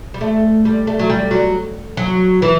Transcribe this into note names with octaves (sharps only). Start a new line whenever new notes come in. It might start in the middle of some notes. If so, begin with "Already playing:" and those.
G3
A3
G3
A3
F#3
G3
F#3
F#3
E3